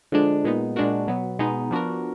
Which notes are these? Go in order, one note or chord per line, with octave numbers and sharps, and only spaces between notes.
D3 F3 G#3 D4
A#2 G#3 B3 D#4
A#2 G#3 D4 F#4 A#4
B2 F#3 B3
B2 G#3 B3 D#4
F3 B3 D4 F#4 A#4